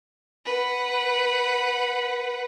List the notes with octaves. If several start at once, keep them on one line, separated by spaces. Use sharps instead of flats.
B4 F#5